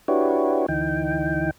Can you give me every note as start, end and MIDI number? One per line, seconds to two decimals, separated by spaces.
0.08 0.66 62
0.08 0.66 64
0.08 0.66 66
0.08 0.66 67
0.08 0.66 71
0.08 0.66 73
0.68 1.51 38
0.68 1.51 52
0.68 1.51 63
0.68 1.51 79